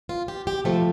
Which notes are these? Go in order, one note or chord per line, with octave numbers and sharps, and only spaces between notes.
F4
G4
G4
F2 C3 F3 A3 A4